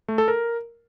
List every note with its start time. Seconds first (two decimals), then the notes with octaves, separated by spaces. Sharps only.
0.08 A3
0.18 A4
0.28 A#4